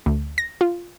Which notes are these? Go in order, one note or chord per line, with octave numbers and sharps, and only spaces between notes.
D2
A#6
F4